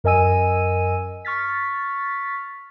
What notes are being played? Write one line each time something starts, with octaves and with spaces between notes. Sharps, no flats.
F#2 A#4 D#5 G#5 E6 D#7
C#6 F6 A6 B6